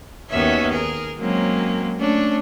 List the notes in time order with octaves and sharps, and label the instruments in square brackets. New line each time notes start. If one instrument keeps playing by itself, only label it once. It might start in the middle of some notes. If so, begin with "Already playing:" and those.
[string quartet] D#2 D#3 B3 C#4 F#4 E5
G#4 A#4
F#3 G#3 A#3 C4 C#4
A3 C#4 D4